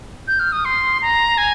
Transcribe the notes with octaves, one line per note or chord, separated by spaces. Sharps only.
G6
F6
D#6
C6
A#5
G#5